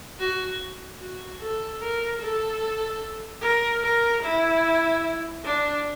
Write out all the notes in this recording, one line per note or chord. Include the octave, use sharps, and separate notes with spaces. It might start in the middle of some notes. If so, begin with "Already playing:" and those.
F#4
F#4
A4
A#4
A4
A#4
A#4
E4
D4